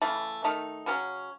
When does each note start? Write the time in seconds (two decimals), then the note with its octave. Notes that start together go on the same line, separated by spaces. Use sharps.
0.02 C#3 E3 A3
0.44 D#3 A3 D#4
0.86 C#3 F#3 C#4